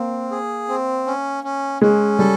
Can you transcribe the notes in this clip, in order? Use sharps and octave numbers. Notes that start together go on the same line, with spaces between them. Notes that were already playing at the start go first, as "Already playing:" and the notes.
Already playing: A#3 C4
G#4
C4
C#4
C#4
G#3 C#4
G3 A4